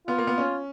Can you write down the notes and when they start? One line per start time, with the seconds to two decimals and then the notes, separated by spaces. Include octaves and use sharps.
0.07 B3 F4
0.18 A#3
0.27 B3
0.38 C#4